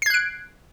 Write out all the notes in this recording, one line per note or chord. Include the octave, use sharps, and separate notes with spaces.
F#6 G#6 C7 D7